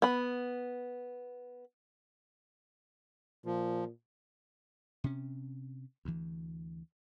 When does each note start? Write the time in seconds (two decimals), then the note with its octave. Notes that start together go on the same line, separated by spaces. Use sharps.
0.02 B3 B5
3.46 A#2 F3
5.04 C3 C#4
6.05 D2 E3